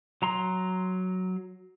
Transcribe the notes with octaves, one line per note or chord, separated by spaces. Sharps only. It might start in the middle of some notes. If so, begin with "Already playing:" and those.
F#3 A#5 C6